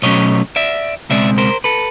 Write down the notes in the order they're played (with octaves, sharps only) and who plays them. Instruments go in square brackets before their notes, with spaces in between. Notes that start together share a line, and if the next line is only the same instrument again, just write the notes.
[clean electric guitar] B1 B2 F#3 A3 C#4 C#5 D#5
D5 E5
C#2 B2 G#3 C4 D5 E5
A#4 C5
A4 B4